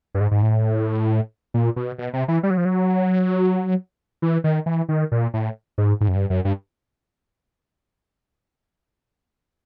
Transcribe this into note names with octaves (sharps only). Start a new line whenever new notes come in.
G2
G#2
G#2
A2
A#2
B2
B2
C3
E3
G3
F#3
F3
F#3
E3
D#3
E3
D#3
A#2
A2
G#2
G#2
F#2
G2
F#2
G2